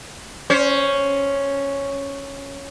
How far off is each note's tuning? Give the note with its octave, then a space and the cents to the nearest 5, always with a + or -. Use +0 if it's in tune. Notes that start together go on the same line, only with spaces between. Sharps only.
C#4 +0 C5 +10